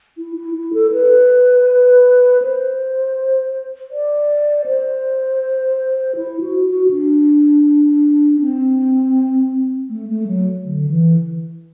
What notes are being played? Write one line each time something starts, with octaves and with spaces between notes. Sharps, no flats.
E4
E4
E4
A4
B4
C5
D5
C5
E4
F#4
F#4
D4
C4
A3
A3
F#3
D3
E3